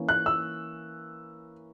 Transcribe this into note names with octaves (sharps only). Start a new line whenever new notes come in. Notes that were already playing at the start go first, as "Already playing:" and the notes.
Already playing: E3 A#3 C#4
F#6
E6